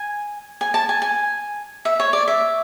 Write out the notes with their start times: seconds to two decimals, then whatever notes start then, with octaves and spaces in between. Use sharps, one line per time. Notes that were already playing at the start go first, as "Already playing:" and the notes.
Already playing: G#5
0.61 G#5
0.74 A5
0.89 G#5
1.02 G#5
1.85 E5
2.00 C#5
2.13 D5
2.28 E5